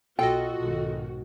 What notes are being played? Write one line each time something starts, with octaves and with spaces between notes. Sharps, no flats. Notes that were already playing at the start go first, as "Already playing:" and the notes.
B1 F4 F#4 A4 D#5 G5
B1 G#2 D#3